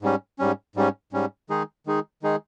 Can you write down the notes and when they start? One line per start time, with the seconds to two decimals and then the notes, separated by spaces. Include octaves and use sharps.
0.02 G#2 G3 C#4
0.39 G#2 G3 C#4
0.76 G#2 G3 C#4
1.13 G#2 G3 C#4
1.50 D#3 G#3 D#4 G#4
1.87 D#3 G#3 D#4 G#4
2.23 D#3 G#3 D#4 G#4